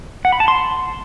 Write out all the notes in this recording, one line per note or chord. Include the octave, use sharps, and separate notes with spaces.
F#5
B5
A5
C6